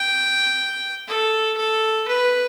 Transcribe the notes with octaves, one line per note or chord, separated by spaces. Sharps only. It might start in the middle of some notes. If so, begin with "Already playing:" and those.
Already playing: G5
A4
A4
B4